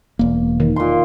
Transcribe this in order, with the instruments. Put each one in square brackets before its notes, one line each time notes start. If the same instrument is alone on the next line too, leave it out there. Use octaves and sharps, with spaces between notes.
[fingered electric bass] E1 A#3
[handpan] D#3
[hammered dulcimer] A#2 C6